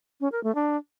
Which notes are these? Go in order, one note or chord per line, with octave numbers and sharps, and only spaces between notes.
C#4
A#4
A3
D4